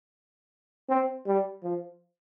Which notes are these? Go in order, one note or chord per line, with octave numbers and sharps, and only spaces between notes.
C4
G3
F3